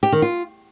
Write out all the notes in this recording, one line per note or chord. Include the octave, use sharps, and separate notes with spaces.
G4
D#3
F4